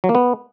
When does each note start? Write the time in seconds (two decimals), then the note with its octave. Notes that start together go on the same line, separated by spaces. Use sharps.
0.04 F#3
0.09 A#3
0.15 B3